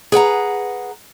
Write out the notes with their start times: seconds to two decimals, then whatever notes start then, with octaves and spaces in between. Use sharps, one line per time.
0.12 G#4 B4 F#5 A#5